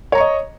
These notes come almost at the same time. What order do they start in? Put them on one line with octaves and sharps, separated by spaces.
C#5 A#5 C#6 D#5